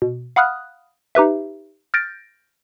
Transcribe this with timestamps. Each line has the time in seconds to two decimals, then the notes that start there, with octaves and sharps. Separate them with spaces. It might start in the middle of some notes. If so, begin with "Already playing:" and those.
0.02 B2
0.36 F5 F#5 B5 D#6 F6 F#6
1.15 D#4 G4 B4 E5
1.94 F6 G6 A6 A#6 D7